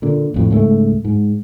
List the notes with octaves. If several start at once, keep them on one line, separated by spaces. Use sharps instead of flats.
A#2 D3
A1 F2 A2
C#2 G#2 G3 A3
G#2